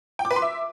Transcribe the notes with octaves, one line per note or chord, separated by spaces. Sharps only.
G5
D6
B4
C6
E5